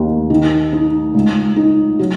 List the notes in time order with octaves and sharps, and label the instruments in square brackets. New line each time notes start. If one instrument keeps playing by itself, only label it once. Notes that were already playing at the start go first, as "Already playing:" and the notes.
Already playing: [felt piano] D#2 D#3
D#3
D#4
C#2
D#4
F#3